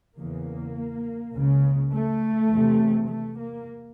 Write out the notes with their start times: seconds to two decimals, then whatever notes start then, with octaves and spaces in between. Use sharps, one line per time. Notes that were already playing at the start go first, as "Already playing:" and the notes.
0.16 E2 C#3 A#3
1.33 C#2 C#3
1.92 A3
2.50 E2 C3
3.09 A3
3.39 A#3